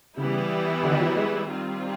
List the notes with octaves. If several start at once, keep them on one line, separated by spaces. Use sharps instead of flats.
C#3 E3 G3 B3 E4 G4
D3
D#3
F3
F#3
G#3
D#3 G3 C4 F4